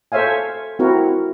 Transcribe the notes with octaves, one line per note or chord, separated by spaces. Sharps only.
A4 C5 C#5 E5 F5 G#5
C4 E4 F#4 A#4